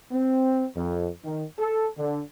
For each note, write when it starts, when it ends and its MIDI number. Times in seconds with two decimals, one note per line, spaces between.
0.11 0.66 60
0.76 1.10 41
1.25 1.46 51
1.59 1.87 69
1.98 2.22 50